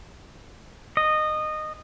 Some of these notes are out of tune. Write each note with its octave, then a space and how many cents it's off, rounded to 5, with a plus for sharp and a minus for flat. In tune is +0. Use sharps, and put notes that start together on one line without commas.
D#5 -20